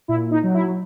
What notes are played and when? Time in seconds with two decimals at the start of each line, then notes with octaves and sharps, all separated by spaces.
0.08 A#2 E4
0.31 D#4
0.43 F#3
0.54 E4